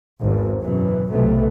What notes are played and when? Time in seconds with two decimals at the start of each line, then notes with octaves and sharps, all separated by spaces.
0.19 G#1 E2 G#2
0.61 F#2 B2 E3 F#3
1.11 B1 C3 F#3 A3 B3